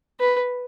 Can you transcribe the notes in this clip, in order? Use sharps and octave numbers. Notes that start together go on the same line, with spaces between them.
B4